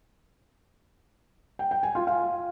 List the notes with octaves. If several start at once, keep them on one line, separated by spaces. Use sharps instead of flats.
G5
G5
G#5
F4
F5